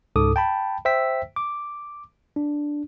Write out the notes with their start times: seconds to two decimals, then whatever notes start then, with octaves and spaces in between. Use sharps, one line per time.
0.16 C#2 G#2 A4 D6 D#6
0.36 G5 A5 B5
0.85 C5 E5 G5 E6 B6
1.36 D6
2.36 D4